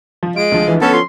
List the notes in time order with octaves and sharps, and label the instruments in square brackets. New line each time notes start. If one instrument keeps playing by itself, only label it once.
[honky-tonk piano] F3
[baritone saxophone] G#3 [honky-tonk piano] F4 [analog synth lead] D7
[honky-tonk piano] D2 F3
[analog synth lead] E3
[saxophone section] B3 C#4 A4 [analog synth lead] A5
[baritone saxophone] F3 [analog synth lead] C6